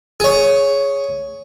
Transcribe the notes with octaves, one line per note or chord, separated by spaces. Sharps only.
G#4 C#5